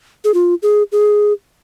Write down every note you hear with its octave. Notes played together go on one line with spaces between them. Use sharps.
G#4
F4
G#4
G#4